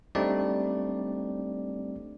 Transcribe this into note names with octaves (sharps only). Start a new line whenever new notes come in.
G3 A3 C4 D4 D#4 D5